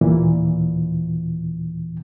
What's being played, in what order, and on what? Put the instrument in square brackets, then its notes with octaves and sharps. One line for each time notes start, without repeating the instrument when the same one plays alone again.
[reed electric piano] D#2 A#2 E3